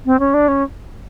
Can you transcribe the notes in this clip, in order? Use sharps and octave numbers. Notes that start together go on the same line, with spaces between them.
C4
C#4
D4
C#4